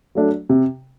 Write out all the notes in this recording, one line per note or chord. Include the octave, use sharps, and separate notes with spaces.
F#3 A3 D4
C3